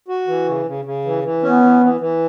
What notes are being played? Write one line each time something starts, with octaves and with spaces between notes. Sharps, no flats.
F#4
E3
C#3
C#3
C#3
E3
E3
B3 C#4
E3
E3
E3